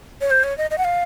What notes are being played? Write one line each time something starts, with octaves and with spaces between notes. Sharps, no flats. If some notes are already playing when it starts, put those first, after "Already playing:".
C#5
C5
C#5
D#5
D#5
F#5
F5